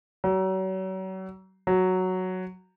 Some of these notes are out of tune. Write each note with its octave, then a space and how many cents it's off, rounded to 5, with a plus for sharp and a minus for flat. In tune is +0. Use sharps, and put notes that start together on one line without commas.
F#3 +35
F#3 +0